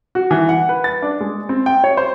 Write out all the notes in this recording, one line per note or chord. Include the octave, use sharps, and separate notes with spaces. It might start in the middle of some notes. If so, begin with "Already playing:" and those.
F#4
E3
F#5
B4
A6
D4
G#3
C4
G5
C#5
C5